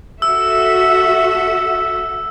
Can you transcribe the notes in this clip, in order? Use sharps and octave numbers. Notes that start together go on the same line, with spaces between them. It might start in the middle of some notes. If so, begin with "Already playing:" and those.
F#4 A4 E5 E6